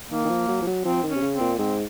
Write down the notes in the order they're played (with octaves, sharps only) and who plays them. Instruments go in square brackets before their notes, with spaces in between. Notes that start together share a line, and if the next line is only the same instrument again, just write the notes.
[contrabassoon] D#3 [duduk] A#3
[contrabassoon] D#3
F3
F#3
F3
F#3
[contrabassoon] F3 [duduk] C4
[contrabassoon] D#3
[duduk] C#4
[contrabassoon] C3
C#3
[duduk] C4
[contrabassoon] A#2
[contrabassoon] G#2 [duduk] C4